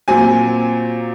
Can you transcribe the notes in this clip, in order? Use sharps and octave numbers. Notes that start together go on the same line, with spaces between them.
A#2 F#3 C4 G#5